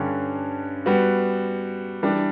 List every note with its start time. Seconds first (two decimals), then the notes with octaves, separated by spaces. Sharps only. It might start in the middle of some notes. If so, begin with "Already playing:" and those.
Already playing: G2 D3 G3 C#4
0.86 G3 B3 F#4
2.03 E3 G3 D4